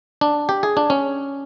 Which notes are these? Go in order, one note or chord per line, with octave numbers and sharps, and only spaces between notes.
D4
G4
G#4
D4
C#4